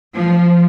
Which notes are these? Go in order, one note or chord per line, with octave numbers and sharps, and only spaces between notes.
F3